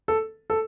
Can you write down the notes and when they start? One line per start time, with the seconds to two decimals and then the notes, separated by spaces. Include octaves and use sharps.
0.08 A4
0.50 A4